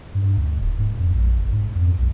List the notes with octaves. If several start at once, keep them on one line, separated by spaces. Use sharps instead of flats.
G2
D2
D1
G#2
F2
A#1
G1
G#2
F2
B1